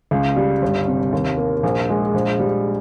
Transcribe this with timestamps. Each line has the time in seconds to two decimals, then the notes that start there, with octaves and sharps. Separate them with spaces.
0.11 C#2
0.36 G3
0.62 G1
0.88 C3
1.12 D#2
1.37 A#3
1.63 A#1
1.89 G#3
2.14 A#1
2.39 G3